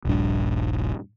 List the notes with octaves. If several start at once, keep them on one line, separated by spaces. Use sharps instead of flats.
D#1 A#1 G2 D4